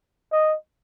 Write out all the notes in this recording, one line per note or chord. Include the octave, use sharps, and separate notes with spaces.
D#5